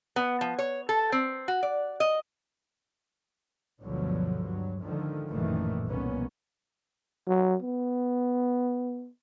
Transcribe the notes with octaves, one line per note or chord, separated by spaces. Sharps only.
B3
F3
C#5
A4
C4
F#4
D5
D#5
G1 D2 B2 D3 F3 F#3
G2 F#3
G#2 D3 D#3 F3
A1 F#2 A#2 D#3 E3 A3
C2 F2 B2 A#3 B3 C#4
F#3
B3